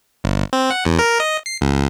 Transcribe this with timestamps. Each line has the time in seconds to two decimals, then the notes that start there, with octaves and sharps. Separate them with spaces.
0.24 G1
0.53 C4
0.70 F#5
0.85 E2
0.99 A#4
1.20 D#5
1.46 C7
1.61 C#2